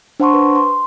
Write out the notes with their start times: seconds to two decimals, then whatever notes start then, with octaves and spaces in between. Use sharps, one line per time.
0.20 D4 C5 F#5 A5 C6 C#6
0.34 B4
0.55 C6